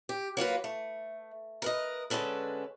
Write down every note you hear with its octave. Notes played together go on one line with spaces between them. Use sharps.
G4
F#3 A#3 F4 B4
A3
A#4 B4 D#5
D3 G#3 C#4 A4 B4